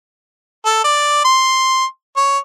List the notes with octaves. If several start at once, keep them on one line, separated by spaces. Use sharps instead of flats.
A4
D5
C6
C#5